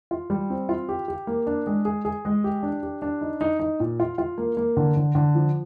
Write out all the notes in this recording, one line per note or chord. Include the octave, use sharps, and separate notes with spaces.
F4
G3
C4
F4
G4
G4
A#3
D4
G#3
G#4
G#4
G#3
G4
D4
G4
D4
D#4
D#4
D#4
A#2
F4
F4
A#3
A#3
D3
D3
D3
F3